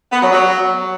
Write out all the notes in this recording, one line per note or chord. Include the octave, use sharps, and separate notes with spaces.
B3
F#3
F#3